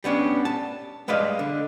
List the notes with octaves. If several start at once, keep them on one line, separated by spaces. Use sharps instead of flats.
G3 B3 C#4 D4
A5
G3 G#3 B4 D5 D#5 F5
D3